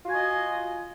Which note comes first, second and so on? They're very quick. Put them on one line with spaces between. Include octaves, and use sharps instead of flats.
F4 F#4 G#5 D#5